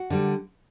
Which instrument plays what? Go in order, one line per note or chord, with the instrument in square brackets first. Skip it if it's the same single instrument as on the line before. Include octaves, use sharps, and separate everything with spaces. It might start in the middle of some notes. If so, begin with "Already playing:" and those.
Already playing: [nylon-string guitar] F#4
D3 G3